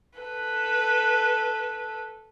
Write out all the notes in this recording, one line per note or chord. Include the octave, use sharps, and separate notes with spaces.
A4 B4